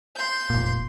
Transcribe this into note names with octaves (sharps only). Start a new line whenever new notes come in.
C6 G6
F1 A#2